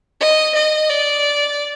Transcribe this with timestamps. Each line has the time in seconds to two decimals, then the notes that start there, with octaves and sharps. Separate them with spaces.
0.21 D#5
0.55 D#5
0.90 D5